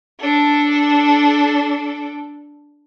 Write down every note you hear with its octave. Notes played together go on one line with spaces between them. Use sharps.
D4 A4